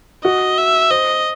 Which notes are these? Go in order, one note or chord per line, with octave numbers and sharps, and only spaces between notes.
F#4 D#5
E5
C5 D#5